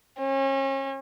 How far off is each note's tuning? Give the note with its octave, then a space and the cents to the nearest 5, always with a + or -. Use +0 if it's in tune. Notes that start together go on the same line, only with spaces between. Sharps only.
C#4 -35